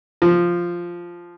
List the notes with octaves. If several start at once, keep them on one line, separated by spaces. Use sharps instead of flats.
F3